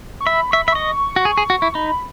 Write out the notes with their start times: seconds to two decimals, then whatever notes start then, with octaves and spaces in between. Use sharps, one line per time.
0.21 C#6
0.27 E5 B5
0.51 E5 C#6
0.62 B5
0.68 E5
0.72 D#5 C#6
1.16 F#4
1.25 G#4
1.38 G#4
1.50 F#4
1.62 E4
1.75 D#4 B5